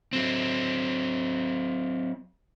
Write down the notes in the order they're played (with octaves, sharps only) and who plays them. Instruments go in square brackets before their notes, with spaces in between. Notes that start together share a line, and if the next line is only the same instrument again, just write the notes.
[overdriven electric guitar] F#3 C4